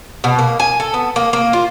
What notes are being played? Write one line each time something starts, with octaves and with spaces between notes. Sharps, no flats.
B2
A#3
G#5
A4
B3
A#3
A#3
F4